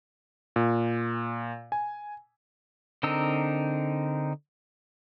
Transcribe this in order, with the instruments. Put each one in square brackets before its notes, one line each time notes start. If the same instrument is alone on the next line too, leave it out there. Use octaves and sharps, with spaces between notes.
[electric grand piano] A#2
G#5
[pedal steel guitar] D3 C4 D#4 A#4 E6